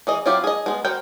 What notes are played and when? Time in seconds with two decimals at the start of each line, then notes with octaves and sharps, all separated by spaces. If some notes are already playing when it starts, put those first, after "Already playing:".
0.07 E3 G#4 D#5
0.26 F#3 C4 E4 F4 G4
0.44 G#4 D#5
0.66 G#3 B3
0.85 F#4 A#4 C5 G5